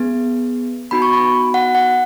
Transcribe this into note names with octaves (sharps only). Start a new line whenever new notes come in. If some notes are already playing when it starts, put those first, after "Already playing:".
Already playing: B3 G#4
B3 D#4 F#4 B5
C#6
B5
F#5
F#5